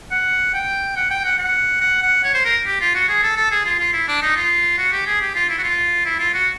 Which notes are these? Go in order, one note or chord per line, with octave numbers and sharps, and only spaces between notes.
F#5
G5
F#5
G5
F#5
F#5
F#5
F#5
C#5
C5
A#4
G4
F4
F#4
G#4
A4
A4
G#4
F4
F4
E4
D4
D#4
F4
F#4
G4
G#4
G4
F4
E4
F#4
F4
E4
F4
F#4